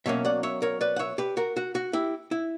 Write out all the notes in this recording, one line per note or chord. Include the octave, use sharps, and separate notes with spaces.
B2 F#3 A#3 C#4 C#5 E5
D5 F#5
C#5 E5
A#4 C#5
B4 D5
F#5
C#5 E5
G4 B4
F#4 A#4
F#4
F#4
E4 G4
E4